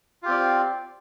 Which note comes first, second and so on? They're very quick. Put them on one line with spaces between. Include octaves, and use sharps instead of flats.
F4 G4 C4 D5